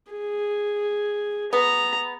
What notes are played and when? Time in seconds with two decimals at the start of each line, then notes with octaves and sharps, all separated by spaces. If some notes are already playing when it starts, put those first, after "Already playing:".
0.12 G#4
1.53 B3 A#5